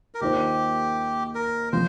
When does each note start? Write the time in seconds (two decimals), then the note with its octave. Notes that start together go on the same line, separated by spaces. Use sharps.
0.15 A#4
0.21 D#2 D#3 A#3 F4 G4 C5
1.35 A#4
1.73 F3 C4 C5